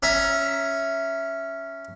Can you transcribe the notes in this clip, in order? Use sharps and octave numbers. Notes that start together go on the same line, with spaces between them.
C#4 E5 A#5